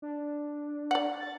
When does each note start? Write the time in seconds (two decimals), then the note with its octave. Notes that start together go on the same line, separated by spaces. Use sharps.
0.02 D4
0.91 D5 F#5
1.20 A6